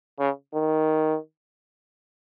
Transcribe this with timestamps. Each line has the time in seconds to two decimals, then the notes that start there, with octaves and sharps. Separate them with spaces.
0.19 C#3
0.54 D#3